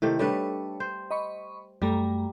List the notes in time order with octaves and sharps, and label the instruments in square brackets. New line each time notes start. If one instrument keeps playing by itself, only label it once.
[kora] C3 D#3 A3 [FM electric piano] E4
[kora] G3 A3 B4 [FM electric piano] D4 A4 C#5
[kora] C5
[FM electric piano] D#5 B5 C#6
[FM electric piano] F#2 A3 A#5 [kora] G3